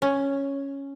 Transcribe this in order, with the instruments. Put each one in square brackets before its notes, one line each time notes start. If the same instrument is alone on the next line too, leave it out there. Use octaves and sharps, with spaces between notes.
[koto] C#4